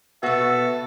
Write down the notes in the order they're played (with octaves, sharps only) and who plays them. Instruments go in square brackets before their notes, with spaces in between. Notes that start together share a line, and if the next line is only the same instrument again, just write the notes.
[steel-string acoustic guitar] B2 B3 [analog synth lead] F#4 [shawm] A4 [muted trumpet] E5